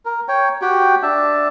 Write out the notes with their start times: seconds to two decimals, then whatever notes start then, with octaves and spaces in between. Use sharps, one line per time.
0.05 A#4
0.28 C#5 G5
0.62 F#4 G4 G5
1.03 D4 E5 A5